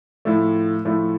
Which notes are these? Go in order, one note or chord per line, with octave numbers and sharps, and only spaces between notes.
A2 F3 A3
A2 F3 A3